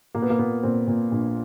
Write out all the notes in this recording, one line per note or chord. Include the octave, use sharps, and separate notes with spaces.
A#2 A#3
B3
A#3
A#2 B3
A#2 C4
A#2
A#1